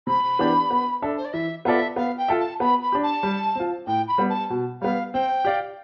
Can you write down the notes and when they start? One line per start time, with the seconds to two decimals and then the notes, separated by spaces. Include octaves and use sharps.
0.07 C3 B5
0.39 E3 B3 D4 G4
0.70 B3
1.02 D4 A4 E5
1.17 C5
1.25 D5
1.33 E3 E5
1.65 B3 F4 A4 D5 E5
1.96 B3 F5
2.18 G5
2.28 F4 A4 E5
2.39 A5
2.60 B3 B5
2.82 B5
2.92 D4 G4
3.03 A5
3.23 G3
3.55 C4 F4
3.87 A2 G5
4.08 B5
4.18 G3 B3
4.29 A5
4.50 B2
4.81 G3 B3 F5
5.13 C4 G5
5.45 G4 D5 F5